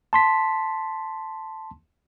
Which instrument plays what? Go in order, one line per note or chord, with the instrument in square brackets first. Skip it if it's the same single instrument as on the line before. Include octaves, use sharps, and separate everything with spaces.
[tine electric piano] A5 C6 B6